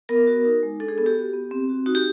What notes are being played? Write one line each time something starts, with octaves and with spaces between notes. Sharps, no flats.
B3 A#4
F#4
D#4
G#3
D4 A4
G#4
B3 A4
G4
F#4
B3
C4
F#4
D#4 F#4
G4